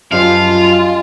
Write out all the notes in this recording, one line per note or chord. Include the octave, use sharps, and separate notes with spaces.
F#2 F3 G3 G#3 F4 F5